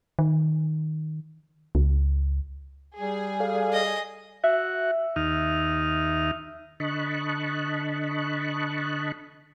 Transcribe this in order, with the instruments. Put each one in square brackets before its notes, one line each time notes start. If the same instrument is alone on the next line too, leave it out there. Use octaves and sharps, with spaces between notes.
[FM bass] D#3
C#2
[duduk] G3 [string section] G#4
[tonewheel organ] A4 D5 F5
[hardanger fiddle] D#5
[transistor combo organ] F#4 [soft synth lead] E5
[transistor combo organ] D#2 D#4 F6
[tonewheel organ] D3 D#5 A5 B5 C#6 F#6